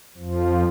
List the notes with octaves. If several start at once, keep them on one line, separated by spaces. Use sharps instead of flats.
F2 F3